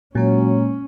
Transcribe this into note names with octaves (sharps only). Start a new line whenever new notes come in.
A#2 F#3 G#3 A#3 C#4 C#5